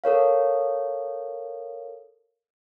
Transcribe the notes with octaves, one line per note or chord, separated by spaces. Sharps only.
A4 A#4 C#5 F5